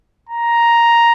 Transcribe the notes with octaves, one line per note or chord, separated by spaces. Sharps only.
A#5